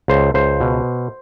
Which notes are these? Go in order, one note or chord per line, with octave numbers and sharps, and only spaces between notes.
C#2 C5
C#2 C5
B2